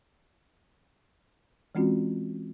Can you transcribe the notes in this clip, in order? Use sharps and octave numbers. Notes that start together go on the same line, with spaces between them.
E3 G#3 C4 C#4 F4 F#4